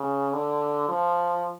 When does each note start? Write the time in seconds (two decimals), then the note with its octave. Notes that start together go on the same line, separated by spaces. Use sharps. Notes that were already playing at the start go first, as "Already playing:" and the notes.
Already playing: C#3
0.33 D3
0.89 F3